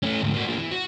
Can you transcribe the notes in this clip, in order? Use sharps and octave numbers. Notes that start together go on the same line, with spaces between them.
A3 C#4
D2 G#2
A#3 F#4
F3 A#3
E3
F#4